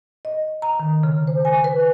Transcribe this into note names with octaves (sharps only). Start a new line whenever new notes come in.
D#5
A#5
D#3
C#3
C5
G#5
B4